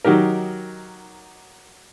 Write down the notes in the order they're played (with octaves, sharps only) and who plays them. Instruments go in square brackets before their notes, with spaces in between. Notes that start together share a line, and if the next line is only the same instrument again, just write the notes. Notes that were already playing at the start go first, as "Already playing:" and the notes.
[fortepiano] D#3 F#3 D#4 G4 A#4